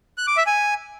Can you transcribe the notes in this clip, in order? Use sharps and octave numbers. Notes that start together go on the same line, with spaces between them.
F#6
D6
E5
G#5